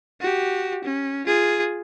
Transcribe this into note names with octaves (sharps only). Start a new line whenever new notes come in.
F#4 G4
C#4
F4 G#4